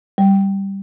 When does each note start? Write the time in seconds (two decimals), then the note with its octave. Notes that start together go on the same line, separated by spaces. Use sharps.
0.18 G3